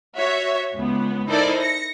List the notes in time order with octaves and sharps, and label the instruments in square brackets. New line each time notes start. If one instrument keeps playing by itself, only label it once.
[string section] F#4 C#5 E5
C#2 B3
D#4 E4 A4 A#4 C5 D5
A#6 C#7